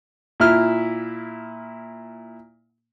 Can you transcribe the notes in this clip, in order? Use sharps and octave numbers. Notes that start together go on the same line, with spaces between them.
A#2 E4 F6